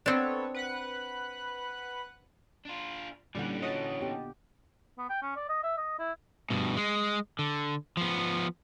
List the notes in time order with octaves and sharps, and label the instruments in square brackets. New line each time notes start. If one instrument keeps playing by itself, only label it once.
[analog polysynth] B3 A4 C#5 [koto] C4 D4
[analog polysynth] B4 F#5 F#6
[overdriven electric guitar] D4 F4
[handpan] A#2 D3 F#5 [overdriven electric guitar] E3 C#4 [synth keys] G3
[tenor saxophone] F#3 [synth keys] D#5 A5
[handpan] B3 G4
[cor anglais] B3
G5
C#4
D5
D#5
E5
D#5
E4
[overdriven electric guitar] G2 B2
G#3
D3
F3 B3